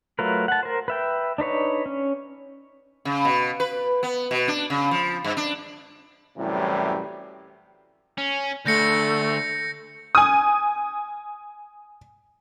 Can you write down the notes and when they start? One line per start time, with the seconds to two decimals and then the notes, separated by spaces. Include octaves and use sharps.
0.19 F#3 A3 F4 A#4 B4
0.48 F#5 A5
0.63 A#4 C5
0.88 B4 E5 G5
1.38 D4 D#4 B4 C#5
1.86 C#4
3.05 C#3
3.25 B2
3.60 B4
4.03 B3
4.31 B2
4.48 D4
4.70 C#3
4.91 F3
5.25 G2
5.37 D4
6.38 F#2 A2 C3 E3 G3
8.18 C#4
8.66 D2 A3 G6 A#6 C#7
10.15 G#5 D#6